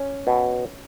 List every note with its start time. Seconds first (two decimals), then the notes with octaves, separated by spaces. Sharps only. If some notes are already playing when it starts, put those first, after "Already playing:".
Already playing: C#4
0.27 B2